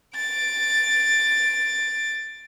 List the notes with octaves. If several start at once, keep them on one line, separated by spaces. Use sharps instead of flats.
A6 D7